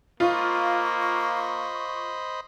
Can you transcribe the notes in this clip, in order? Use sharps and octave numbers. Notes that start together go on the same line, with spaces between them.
A#3 F4 C5 D#5 B5 C#6